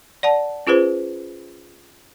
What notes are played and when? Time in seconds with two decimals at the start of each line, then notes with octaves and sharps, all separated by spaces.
0.23 D5 F#5 A5
0.67 C#4 F4 G#4 B4 C5